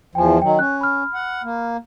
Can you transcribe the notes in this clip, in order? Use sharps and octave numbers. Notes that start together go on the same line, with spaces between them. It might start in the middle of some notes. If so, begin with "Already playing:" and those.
E2 F3 G5 G#5
D#3 F#3 G5
C#4 F#6
B5 F6
F#5
A#3